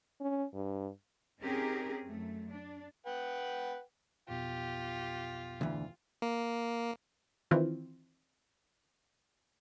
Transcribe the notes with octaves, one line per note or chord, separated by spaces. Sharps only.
C#4
G2
C4 C#4 D#4 G4 G#4 A#4
F#2 A3
D4
B4 F#5 G5
B1 F2 B2 F4 G4
D2 E3
A#3
D#3 E3 C4 F4